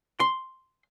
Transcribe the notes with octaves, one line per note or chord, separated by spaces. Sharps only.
C6